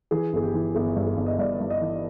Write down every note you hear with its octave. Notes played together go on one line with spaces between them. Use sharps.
E3 G#4
G1 G#4
G4
E3
G1 G#4
G2
G#4
G1
D#5
G2 D5
G2
D#5
E3